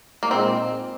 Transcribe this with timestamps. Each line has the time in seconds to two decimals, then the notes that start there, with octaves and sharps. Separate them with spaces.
0.23 A#3
0.31 A#2 G#3 C4 D#4